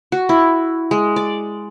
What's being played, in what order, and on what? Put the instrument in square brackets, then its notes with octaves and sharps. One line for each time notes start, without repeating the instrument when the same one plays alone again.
[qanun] F#4
E4
G#3
D5